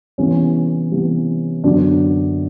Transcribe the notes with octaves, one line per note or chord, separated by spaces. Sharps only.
C3 E3 G3 B3 C#4
C3 E3 G3 B3
F#2 D3 F#3 B3 D4